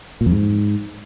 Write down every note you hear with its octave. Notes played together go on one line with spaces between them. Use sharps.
A#2
F2
G#2